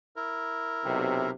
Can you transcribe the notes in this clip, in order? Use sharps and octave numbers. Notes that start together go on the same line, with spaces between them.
E4 A#4
B1 C3